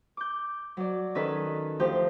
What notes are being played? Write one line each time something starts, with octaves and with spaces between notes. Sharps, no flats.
D6 G6
F#3 D5
D#3 C#4 G#4 A4 B4
D2 F3 G4 C5 G5